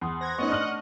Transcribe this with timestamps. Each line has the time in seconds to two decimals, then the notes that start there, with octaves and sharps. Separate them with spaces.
0.01 E2 B5 C6 D#6
0.21 C5 C6 F#6 G#6 A#6
0.38 A3 B3 C#4 D#4 D#5 F#5 C#6 A#6
0.50 D4 F6 F#7